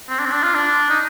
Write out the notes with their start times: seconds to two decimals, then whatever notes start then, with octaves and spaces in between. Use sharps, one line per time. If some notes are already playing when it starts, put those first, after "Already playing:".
0.09 C4
0.20 D4
0.25 C4
0.31 D4
0.43 F4
0.54 D4
0.90 D#4